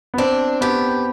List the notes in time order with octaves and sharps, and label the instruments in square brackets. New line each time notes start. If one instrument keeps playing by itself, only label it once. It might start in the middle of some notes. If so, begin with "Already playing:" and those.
[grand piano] B3
[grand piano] C4 [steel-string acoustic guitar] D4
[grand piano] B3 [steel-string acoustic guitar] G4